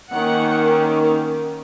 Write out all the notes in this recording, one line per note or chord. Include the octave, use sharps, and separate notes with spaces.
D#3 A#3 C#4 F#5